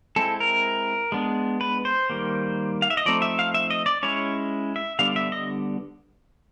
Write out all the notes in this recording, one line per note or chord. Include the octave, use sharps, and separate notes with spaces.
G#3 C4 E4 A4
A#4
G#3 B3 D4
B4
C5
D#3 G3 A#3
F5
E5
D#5
F3 A3 C4 D#4 D5
E5
F5
E5
D#5
D5
G#3 C#4 E4 C#5
E5
D3 G3 B3 D4 F5
E5
D#5